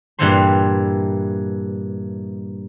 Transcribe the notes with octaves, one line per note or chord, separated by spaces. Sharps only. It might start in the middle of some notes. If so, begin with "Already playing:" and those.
G2 A#2 E3 A4 C5 C6